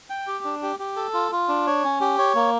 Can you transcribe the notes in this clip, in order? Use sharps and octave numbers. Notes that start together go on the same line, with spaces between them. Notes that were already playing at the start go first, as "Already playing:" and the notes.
G5
G4
D4
G4
G4
A4
F4
F4
D4
C#5
C#4
G4
C#5
A#3